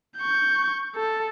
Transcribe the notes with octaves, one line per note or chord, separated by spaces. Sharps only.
C#6 G6
A4